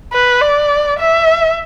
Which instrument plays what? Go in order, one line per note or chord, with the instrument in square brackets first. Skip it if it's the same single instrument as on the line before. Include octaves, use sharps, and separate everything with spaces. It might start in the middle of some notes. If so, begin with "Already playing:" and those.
[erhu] B4
D5
E5